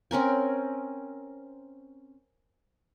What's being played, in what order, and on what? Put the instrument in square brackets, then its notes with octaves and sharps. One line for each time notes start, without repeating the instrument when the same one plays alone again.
[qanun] C4 C#4 A#4 G#5